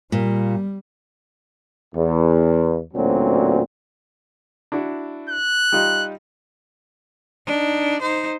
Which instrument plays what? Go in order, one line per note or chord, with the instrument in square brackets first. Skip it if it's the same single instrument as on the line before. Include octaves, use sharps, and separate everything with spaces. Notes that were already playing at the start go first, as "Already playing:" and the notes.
[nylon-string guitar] A#2 [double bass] G3
[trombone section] E2
A1 D2 A#2 F#3 C4 C#4
[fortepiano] D4 E4 F#4
[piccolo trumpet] F#6
[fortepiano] G3 D#4 F4
[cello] D4 D#4
D#4 C5